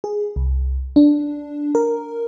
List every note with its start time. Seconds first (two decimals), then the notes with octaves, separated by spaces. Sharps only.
0.04 G#4
0.36 C2
0.96 D4
1.75 A#4